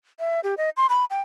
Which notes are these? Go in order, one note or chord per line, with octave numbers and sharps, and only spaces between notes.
E5
G4
D#5
C6
B5
G5